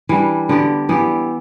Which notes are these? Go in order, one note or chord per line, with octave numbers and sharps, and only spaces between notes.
E3 G3 D4
D3 B3 G4
E3 B3 E4 G4